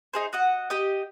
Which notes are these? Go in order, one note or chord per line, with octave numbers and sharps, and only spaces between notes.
D#4 G#4 C5
F#4 D#5 F#5
G4 D#5